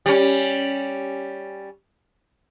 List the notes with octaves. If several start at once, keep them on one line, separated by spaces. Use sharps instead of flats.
G3 C#4